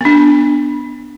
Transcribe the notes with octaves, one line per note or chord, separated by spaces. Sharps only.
B3 D4